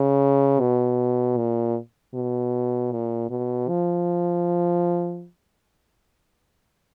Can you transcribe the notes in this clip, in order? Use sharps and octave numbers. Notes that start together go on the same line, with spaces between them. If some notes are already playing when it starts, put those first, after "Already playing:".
Already playing: C#3
B2
A#2
B2
A#2
B2
F3